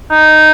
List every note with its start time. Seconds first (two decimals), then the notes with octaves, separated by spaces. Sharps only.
0.10 D#4